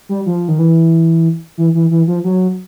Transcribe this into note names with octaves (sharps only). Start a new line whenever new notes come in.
G3
F3
D#3
E3
E3
E3
E3
F3
F#3